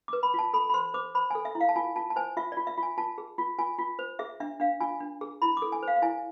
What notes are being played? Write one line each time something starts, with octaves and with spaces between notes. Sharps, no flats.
D6
B4
B5
F4 A5
A4 B5
B5
C5 C6
C5 D6
C5 B5
G#5
A4
E5
E4
F5
A5
F4 G#5
F4 A5
A5
C5 G#5
F4 E5
D5
F4
E5
F4
G#5
F4 A5
G#4
F4
F4 G#5
F4
C5
G#4 E5
D4 E5
D4 F5
F4 G#5
D4
G#4
E4 B5
D6
A4
G#5
C5 F5
F5
E4 G#5